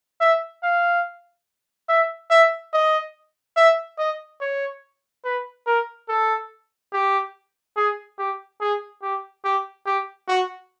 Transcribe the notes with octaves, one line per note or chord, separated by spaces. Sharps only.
E5
F5
E5
E5
D#5
E5
D#5
C#5
B4
A#4
A4
G4
G#4
G4
G#4
G4
G4
G4
F#4